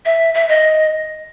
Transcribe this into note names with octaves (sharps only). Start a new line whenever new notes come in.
E5
E5
D#5